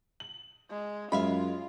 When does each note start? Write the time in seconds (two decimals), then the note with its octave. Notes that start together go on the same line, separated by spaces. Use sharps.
0.20 F#7
0.70 G#3
1.12 F#2 G#3 F4 E5 F5 B5